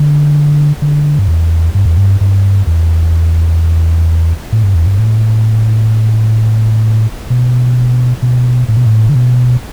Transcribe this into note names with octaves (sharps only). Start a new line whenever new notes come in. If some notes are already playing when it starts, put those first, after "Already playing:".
Already playing: D3
D3
G2
E2
G2
E2
G2
G2
E2
A2
G2
E2
G2
A2
B2
B2
A2
B2
A2
D3
B2